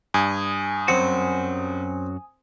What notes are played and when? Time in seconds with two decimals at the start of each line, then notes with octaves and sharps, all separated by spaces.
0.14 G2 G#5 D#6
0.88 F#2 F#3 C4 F#4